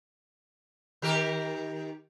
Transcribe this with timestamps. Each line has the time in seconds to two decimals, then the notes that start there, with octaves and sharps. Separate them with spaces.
1.02 D#3 G4 A#4